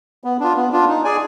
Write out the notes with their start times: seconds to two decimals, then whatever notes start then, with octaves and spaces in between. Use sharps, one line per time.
0.24 B3
0.40 D4 F4
0.56 B3
0.72 D4 F4
0.88 D#4
1.04 G#4 D5 G#5